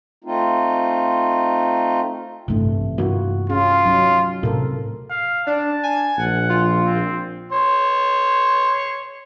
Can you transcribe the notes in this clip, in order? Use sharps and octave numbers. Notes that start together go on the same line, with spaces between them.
A3 C4 D#4 F4
A1 G2 C3 E3 A3
G2 E3 A#3 F4 F#4
C#4 F4 G#4
F#3 C#4 D#4
A2 C3 A4 A#4
F5
D4 A5
G#5
A#1 F#5
F4
C4
C#5 C6